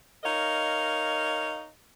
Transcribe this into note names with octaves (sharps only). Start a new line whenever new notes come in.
D#4 A#4 C#5 D#5 F5